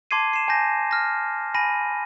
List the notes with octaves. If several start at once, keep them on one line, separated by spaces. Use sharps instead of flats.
A5 C6 D6 G#6 C7 D#7
C7 E7
G#5 A5 G6 A#6
F6 A#6
G#5 B5 A#6 D#7